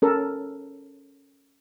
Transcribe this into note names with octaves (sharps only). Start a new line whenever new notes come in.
C#4 A4 A#4